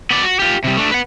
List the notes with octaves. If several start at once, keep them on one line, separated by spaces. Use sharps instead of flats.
B3 D5
F#4
F4 G4
C3 G3
A3 D4
B4 F#5